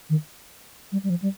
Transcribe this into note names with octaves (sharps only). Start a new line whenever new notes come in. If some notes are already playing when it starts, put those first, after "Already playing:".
D#3
G3
G3
F3
G3